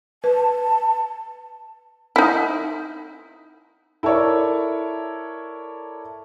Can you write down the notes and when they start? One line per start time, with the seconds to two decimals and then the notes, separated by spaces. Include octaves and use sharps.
0.24 B4 A5
2.16 D#4 E4
4.03 E4 A4 A#4 C#5 D5